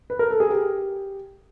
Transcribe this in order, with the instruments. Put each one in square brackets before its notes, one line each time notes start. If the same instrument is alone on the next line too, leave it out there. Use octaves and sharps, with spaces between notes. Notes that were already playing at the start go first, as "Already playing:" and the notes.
[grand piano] B4
A#4
A4
G#4
G4